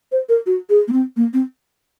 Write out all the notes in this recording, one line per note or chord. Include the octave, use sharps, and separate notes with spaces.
C5
A#4
F#4
G#4
A#3
C4
A#3
C4